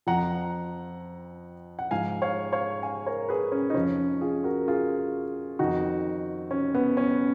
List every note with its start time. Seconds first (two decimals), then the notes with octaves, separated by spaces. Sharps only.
0.07 F2 F3 F#5 A#5
1.79 F#5
1.91 G#2 F3 F5 G#5
2.22 C#5 F5
2.53 C#5 F5
2.83 F5 G#5
3.06 A#4 C#5
3.29 G#4 B4
3.52 C#4
3.70 D#4
3.75 F2 F3 C#4
4.21 F4 G#4
4.44 F#4 A#4
4.68 F4 G#4
5.59 F2 D#3 D#4 F#4
6.51 C#4
6.75 B3
6.97 C#4